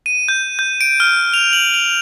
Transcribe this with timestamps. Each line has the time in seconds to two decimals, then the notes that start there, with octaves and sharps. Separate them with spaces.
0.06 D#7
0.28 G6
0.59 G6
0.81 D7
1.00 F6
1.33 F7
1.53 F#7
1.74 F7